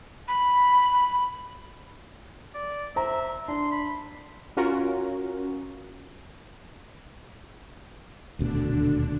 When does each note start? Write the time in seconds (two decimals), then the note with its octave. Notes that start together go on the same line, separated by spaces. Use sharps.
0.28 B5
2.55 D5
2.96 C5 E5 A#5
3.48 D4 C6
3.71 B5
4.57 C#4 F4 F#4 A#4
8.39 D#1 D2 B2 D3 D4